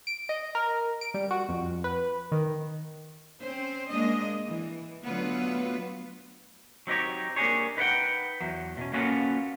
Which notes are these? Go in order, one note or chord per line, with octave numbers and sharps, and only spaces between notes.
D7
D#5
A#4
D7
G3
F#4
F2
B4
D#3
C4 C#4 C5
G#3 A#3 D4 D#5
E3
D3 F#3 A3 B3 F4 B4
F#3 C4 D#4 G4 C#5
A#3 D4 G4 G#4 C#5
D#4 B4 C#5 F#5 G5
E2 F#3
B2 C#4
A#3 B3 C#4 F4 F#4 A4